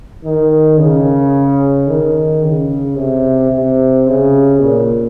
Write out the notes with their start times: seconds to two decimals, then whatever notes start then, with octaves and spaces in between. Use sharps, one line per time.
0.24 D#3
0.78 C#3
1.88 D#3
2.43 C#3
2.97 C3
3.52 C3
4.07 C#3
4.62 A#2